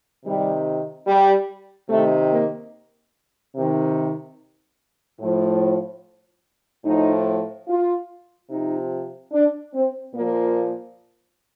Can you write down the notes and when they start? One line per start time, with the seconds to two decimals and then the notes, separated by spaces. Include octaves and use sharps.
0.24 C3 D#3 G3
1.07 G3
1.89 C3 D#3 A3
2.31 A#3
3.55 C3 D#3
5.20 A2 F3
6.85 A2 F3 D#4
7.68 F4
8.50 C3 F3 D#4
9.32 D4
9.73 C4
10.14 A#2 F3 A#3